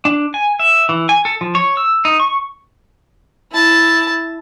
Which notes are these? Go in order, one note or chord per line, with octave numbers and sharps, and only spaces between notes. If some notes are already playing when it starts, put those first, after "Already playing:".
D4
G#5
E5
E3
G#5
A4
F3
C#5
E6
D#4
C#6
E4 A5